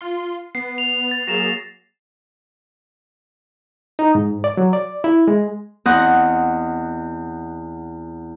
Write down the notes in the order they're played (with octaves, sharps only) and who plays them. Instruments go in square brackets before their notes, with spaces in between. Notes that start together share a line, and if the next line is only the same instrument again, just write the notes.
[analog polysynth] F4 C6
[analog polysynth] B3 [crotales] C7
[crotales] F7
A6
[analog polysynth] F#3 A#3 G#4 [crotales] A#6 E7 F7
[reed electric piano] D#4
G#2
D5
F#3
D5
E4
G#3
[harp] E2 C4 D#5 F#5